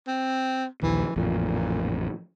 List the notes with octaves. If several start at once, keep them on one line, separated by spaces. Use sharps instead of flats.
C4
A#1 D#2 E3
A1 F2 A#2